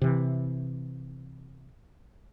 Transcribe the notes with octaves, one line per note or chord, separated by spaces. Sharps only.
C3 E3